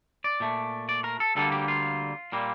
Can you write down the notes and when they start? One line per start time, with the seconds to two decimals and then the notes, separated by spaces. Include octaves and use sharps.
0.24 D5
0.40 A#2 A3
0.89 D5
1.04 A#4
1.20 A4
1.35 D2 D3 G3 A#3 A4
1.52 G4
1.68 F4
2.32 A#2 G3 A#3